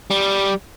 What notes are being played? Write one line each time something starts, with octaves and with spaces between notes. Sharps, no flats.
G3